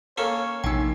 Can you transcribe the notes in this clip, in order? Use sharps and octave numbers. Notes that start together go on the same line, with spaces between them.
A#3 C#4 A4 C#5
A#1 C3 D#4 G5